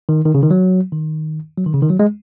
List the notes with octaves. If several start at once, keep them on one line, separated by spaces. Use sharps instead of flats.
D#3
D#3
C#3
D#3
F#3
D#3
F#3
D#3
C#3
D#3
F#3
G#3